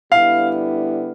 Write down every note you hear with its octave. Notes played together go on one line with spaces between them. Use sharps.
D3 G3 B3 E4 F5